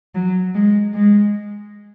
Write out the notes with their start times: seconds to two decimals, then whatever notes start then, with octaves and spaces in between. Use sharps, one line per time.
0.15 F#3
0.55 G#3
0.95 G#3